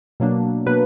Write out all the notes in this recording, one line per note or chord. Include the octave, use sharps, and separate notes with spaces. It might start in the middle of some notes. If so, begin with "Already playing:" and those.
B2 F#3 A#3 D4
B2 F#3 A#3 D4 B4